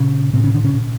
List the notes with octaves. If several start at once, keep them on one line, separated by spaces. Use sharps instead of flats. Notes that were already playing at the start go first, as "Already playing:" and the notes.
Already playing: A#2 C#3 C#4
A2 C3 C4
C#3 C#4
D3 D4
C#3 C#4
A#2